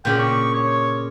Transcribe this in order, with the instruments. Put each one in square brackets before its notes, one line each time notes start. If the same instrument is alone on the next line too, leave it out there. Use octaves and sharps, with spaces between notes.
[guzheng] A#2 C#3 D5 [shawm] G5
[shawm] C#6
C#5